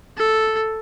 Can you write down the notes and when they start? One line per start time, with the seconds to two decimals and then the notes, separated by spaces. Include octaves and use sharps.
0.17 A4